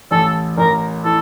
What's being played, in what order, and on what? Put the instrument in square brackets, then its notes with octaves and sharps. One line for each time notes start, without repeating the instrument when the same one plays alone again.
[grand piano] A1 [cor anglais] A4
[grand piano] A1 [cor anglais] A#4
[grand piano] E3 [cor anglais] A4